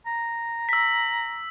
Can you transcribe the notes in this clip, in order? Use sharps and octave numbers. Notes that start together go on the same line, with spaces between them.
A#5
E6 B6